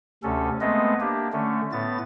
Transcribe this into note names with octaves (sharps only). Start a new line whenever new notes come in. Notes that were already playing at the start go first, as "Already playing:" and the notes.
D2 C3 C#4 A4
G#3 A3 B3 C4 B4 D#5
A#3 D4 G4
D3 A3 C#4
A2 B3 A6